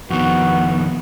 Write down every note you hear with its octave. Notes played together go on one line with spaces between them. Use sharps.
F2 D#3 B3 F#4